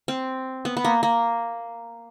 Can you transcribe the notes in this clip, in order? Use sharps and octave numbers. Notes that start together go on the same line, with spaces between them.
C4
B3
B3
A#3
A#3